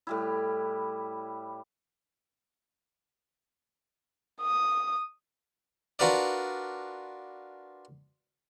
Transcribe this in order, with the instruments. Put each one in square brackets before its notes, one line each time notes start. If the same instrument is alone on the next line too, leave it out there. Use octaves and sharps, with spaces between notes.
[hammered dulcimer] A2 G3 E4
[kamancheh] D#6
[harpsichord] D4 F4 F#4 A#4 B4 D5